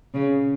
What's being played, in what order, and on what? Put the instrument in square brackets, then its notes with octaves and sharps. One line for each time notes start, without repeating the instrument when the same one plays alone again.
[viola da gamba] C#3